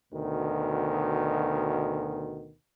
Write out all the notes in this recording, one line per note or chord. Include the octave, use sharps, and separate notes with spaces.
D2 B2 D#3